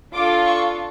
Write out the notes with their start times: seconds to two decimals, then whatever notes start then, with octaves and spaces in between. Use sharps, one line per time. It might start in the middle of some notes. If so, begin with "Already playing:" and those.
0.14 D4 F4 A4 D6
0.47 C#6